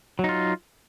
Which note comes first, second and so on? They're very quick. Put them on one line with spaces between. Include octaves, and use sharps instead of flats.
F#3 D#4 F4